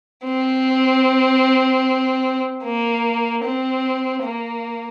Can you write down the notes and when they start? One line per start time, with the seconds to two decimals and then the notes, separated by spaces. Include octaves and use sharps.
0.25 C4
2.64 A#3
3.44 C4
4.23 A#3